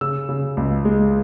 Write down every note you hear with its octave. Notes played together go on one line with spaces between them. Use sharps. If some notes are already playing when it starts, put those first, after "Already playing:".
C#3 E6
C#3
C#2
G#3